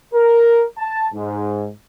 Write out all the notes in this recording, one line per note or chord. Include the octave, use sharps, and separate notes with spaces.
A#4
A5
G#2